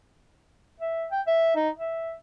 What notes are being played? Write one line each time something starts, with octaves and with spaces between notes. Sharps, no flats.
E5
G5
E5
D#4
E5